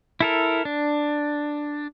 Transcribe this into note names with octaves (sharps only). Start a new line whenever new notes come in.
E4 A4 A#4
D4